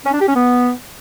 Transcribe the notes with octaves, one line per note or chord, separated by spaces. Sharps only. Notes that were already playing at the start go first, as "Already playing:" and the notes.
C#4
D4
G4
C#4
B3